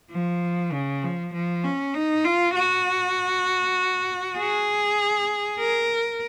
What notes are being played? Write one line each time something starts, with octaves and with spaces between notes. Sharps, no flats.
F3
C#3
F3
F3
C#4
D#4
F4
F#4
G#4
A#4